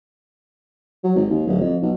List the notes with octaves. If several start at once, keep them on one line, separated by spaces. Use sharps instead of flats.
F#3
G#1
D#2
D1
F2
B1